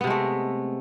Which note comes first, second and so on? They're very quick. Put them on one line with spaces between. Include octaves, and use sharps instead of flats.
B3 C3 G#3 A3